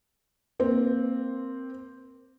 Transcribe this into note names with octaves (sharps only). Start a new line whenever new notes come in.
A#3 C4